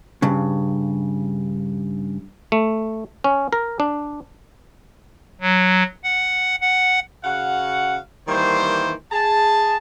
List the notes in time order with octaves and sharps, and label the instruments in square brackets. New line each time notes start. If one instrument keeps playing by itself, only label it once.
[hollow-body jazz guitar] G2 C#3
[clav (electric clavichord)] A3
C#4
A#4
D4
[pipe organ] F#3
F#5
F#5
[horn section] C#3 F#4 F5 F#5
D#3 E3 G3 A#3 C5
G#4 A5